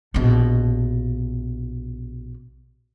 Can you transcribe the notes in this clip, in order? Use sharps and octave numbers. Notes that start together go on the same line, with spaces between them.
A#1 B2